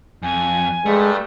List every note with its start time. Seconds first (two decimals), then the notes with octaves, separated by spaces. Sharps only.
0.22 F2 G#5
0.86 G2 G#3 A3